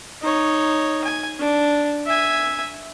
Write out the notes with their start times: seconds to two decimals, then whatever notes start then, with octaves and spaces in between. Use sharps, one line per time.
0.22 D#4 C#5
1.04 G#5
1.39 D4
2.06 E5 G#5